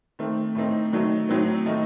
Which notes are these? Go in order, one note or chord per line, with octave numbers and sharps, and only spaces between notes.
D#3 A3 C4
A2 A3 C4 D#4
D#3 F#3 A3 D#4
A2 F#3 C4
D#3 A3 D#4